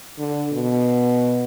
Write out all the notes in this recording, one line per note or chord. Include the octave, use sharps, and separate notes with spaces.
D3
B2